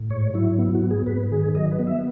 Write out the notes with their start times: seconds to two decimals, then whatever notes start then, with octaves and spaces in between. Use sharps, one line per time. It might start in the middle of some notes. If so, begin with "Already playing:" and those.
Already playing: A2
0.10 G#2 C#5
0.34 F#3 E4
0.59 B3 E4
0.75 F#4
0.82 G#2
0.91 G#4
1.07 G#2 B4
1.32 D#3 G#4
1.55 F#3 D#5
1.71 B4
1.79 B3
1.87 E5